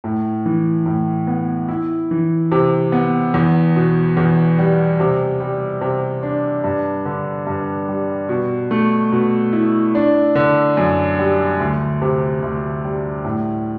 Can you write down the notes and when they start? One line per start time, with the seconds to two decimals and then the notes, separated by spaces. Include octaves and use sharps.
0.04 A2
0.46 E3
0.86 A2
1.27 B3
1.68 E4
2.11 E3
2.52 C3
2.92 B3
3.34 E2
3.76 B2
4.17 E2
4.59 G3
5.00 C3
5.40 G3
5.81 C3
6.23 D4
6.64 G2
7.05 D3
7.47 G2
7.89 G3
8.29 B2
8.71 A3
9.12 B2
9.53 E4
9.95 D4
10.35 D3
10.77 F#2
11.19 G3
11.60 D2
12.02 C3
12.43 D2
12.84 G3
13.25 A2